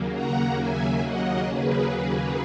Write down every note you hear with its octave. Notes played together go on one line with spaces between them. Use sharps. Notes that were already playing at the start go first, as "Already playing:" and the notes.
Already playing: D#2 C#3 F#3 A#3
F#5 A#5
E5 G#5
D#5 F#5
G#4 B4